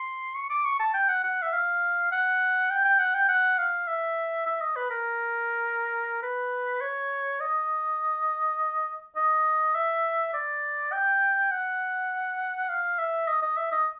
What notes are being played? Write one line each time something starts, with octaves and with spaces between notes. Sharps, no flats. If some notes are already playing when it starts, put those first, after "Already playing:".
Already playing: C6
C#6
D6
C#6
A5
G5
F#5
F#5
E5
F5
F#5
G5
G5
F#5
G5
F#5
F5
E5
E5
D#5
B4
A#4
B4
C#5
D#5
D#5
E5
D5
G5
F#5
F5
E5
D#5
D#5
E5
D#5